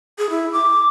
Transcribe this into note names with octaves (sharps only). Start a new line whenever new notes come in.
G#4
E4
D6